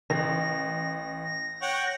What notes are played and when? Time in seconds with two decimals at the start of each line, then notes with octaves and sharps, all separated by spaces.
0.10 A1 A#6
1.62 C#5 F#5 G5